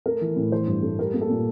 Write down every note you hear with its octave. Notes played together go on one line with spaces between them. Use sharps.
A3 A#4
E3
A2
E3 C5
G2
A3
G3 A#4
A#3
A4
A#2